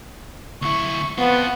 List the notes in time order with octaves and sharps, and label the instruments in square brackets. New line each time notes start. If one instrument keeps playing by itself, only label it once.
[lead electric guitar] D2 E4 [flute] C#6
[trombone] B3 [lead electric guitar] C4 F4 [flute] F#5